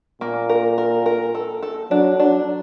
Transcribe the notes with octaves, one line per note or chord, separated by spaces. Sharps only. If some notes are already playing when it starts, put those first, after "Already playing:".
A#2 A#3
A#4
A#4
A#4
A4
A4
F#3 D4
D4